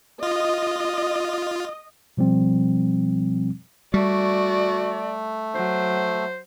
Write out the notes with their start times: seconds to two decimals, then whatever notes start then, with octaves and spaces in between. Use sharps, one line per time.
0.23 F4 D#5
2.17 B2 F3 G3 C4
3.94 G3 A3 F#4 D5
5.55 F#3 C5